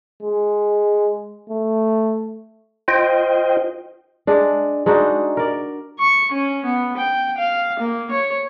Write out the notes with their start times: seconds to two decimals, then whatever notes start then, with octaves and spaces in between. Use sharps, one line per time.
0.23 G#3
1.50 A3
2.88 F4 C5 D#5 G5
4.27 G#3 D4
4.86 G#3 D4 D#4 F#4
5.37 A#4 D5
5.99 C#6
6.32 C#4
6.65 B3
6.97 G5
7.38 F5
7.79 A#3
8.11 C#5